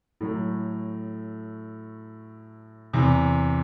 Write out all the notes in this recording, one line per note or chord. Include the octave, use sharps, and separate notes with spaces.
A2 F#3 A3
E2 C3 E3